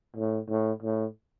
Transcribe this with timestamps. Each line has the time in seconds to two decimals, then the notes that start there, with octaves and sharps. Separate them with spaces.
0.16 A2
0.49 A2
0.83 A2